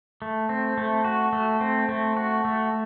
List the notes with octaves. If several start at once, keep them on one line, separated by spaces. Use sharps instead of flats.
A3
C4
A3
F#4
A3
C4
A3
F#4
A3